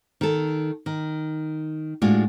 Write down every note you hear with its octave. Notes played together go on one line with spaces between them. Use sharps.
D#3 A4
D#3
A2 G#3 D4 F4 F#4